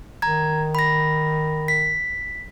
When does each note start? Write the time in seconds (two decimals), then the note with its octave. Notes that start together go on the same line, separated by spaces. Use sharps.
0.22 D#3 A#5 G#6
0.75 B5 A#6
1.68 B6